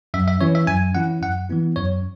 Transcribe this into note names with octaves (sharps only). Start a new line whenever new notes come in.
F#2 E5
E5
E3 C#4 E4 C#5
E5
F#2 G#5
E3 C#4 E4 F#5
F#2 F#5
E3 B3 E4
F#2 C#5